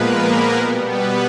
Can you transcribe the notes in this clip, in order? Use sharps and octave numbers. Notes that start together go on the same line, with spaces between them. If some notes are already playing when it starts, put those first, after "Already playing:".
Already playing: A#2 F3 G#3 A#3 B3 A#4 B4
B2 G3 B3
B3 B4